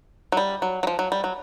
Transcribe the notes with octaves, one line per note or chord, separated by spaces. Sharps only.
F#3
G3
F#3
F#3
F3
F#3
G3
F#3